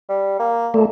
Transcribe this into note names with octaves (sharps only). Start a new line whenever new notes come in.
G3
A#3
A#2 A3